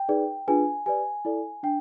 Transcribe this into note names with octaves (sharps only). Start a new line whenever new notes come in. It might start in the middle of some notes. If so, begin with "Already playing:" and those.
Already playing: G5
D#4 G#4 B4 D5
D4 F4 G#4 B4 G#5
G4 B4 D5 G#5
E4 A4 D5
D4 G5